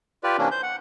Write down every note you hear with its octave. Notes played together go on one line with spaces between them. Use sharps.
F4 G4 B4 D5
C3 E3 A#3 C#4 D4
C5 G6
F#5